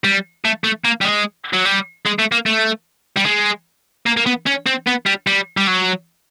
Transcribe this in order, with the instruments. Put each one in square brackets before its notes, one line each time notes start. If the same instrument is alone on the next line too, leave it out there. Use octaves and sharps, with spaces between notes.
[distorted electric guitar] G3
A3
A3
A#3
G3
G#3
F#3
G3
G#3
A3
A#3
A3
G3
G#3
A#3
A#3
B3
C#4
C4
B3
G3
G3
G3
F#3